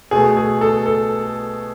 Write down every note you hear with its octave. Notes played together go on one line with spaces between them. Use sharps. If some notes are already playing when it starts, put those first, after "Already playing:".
B2 A3 G#4
G#4
A4
A4